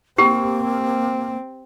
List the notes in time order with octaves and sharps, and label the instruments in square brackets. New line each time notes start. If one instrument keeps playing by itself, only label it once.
[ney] A#3 [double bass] C4 [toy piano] G4
[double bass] C4